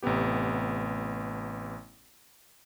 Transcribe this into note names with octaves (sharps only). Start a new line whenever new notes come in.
A1 C3 A3 B3 G4